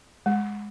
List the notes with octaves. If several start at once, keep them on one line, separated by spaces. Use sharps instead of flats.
G#3